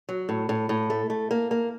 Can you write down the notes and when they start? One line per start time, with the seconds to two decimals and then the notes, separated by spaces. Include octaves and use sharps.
0.09 F#3
0.29 A2
0.49 A2
0.69 A2
0.90 A3
1.10 A3
1.31 A#3
1.51 A#3